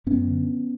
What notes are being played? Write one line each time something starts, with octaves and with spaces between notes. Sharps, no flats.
F#2 B3 C#4
D3